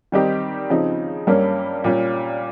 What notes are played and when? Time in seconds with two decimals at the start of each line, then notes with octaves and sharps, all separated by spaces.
0.12 D#3 G3 C4 D#4 G4
0.70 C#3 F3 C4 D#4
1.27 G2 G3 A#3 C#4
1.84 A#2 G3 C#4